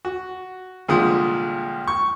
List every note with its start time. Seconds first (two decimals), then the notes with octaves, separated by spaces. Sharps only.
0.05 F#4
0.88 C2 A#2 D3 F3 G#3 D#6
1.88 C#6